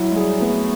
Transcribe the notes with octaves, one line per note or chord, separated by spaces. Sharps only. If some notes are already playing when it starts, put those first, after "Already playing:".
Already playing: F#3 E4
G#3
G3 G#4
A3 B3